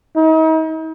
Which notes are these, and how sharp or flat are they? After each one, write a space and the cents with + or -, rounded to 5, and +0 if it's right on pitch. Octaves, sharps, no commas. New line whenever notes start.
D#4 +40